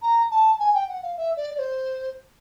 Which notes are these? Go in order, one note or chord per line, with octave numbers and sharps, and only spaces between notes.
A#5
A5
G#5
G5
F#5
F5
E5
D5
D5
C5